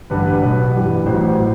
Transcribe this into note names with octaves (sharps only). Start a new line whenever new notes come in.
A1 G2 D3 G3 B4
B4
B1 B2 F#3 B4
A1 G2 E3 G3
A1 A2 F#3 C5
A2